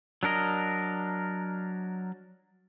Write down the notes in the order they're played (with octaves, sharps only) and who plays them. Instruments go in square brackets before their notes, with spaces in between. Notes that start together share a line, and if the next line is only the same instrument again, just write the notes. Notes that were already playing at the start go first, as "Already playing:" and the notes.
[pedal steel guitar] F#3 D4 A#4 D#5